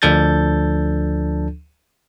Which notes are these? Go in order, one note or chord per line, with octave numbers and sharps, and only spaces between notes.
D2 F3 D4 A4 G6 A6